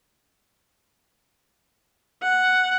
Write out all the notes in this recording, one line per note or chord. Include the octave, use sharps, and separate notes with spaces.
F#5